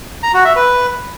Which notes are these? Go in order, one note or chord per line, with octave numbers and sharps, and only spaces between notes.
A#5
F#4
E5
B4